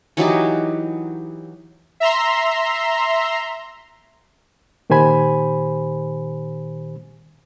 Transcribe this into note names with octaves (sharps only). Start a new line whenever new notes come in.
E3 F#3 D#4 G4
E5 A#5 C6
A#2 D#3 G4 C5 G#5 B5